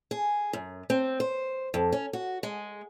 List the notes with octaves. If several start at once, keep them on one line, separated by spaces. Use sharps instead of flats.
G#4
F#2
C4
C5
F2
C#4
F#4
G#3